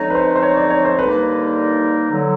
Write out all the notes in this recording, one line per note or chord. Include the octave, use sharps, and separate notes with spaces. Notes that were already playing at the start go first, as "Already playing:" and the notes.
Already playing: D3 F3 G#3 C4 D#4 C#5
B4
C5
C5
C#5
D5
C#5
C5
D#2 D3 G3 A#3 D#4 B4
D3 F#3